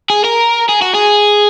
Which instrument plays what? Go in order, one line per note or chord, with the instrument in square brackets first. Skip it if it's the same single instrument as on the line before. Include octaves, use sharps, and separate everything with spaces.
[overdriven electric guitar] G#4
A#4
G#4
F#4
G#4